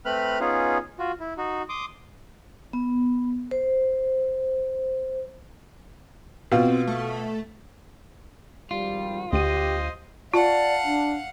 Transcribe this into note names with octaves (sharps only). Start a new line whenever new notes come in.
A3 C4 B4 B5 F6 F#6
B3 C#4 D#4 F4 G#4
F4 F#4
E4
D#4 F#4
C6 D6 D#6
B3
C5
B2 C4 F4
A3
G#1 F3 G3 F4
D2 G4 C5 D#5 D#7
F4 D5 F5 F#5 A5
D4